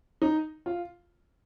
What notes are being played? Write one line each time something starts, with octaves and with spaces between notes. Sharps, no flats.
D#4
F4